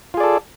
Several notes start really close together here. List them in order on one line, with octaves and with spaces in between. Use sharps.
F4 G#4 D5 A4